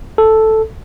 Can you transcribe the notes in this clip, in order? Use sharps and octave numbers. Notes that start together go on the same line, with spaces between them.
A4